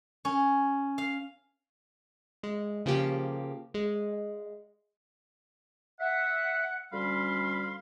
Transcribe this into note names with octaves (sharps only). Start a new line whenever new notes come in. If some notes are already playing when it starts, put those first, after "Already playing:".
C#4
F5
G#3
C#3 F3 A#3 G4
G#3
E5 F#5
D2 G3 C#4 F5 B5 C6